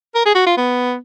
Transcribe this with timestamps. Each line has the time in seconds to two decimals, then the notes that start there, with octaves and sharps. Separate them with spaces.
0.15 A#4
0.25 G#4
0.35 F#4
0.47 F4
0.57 B3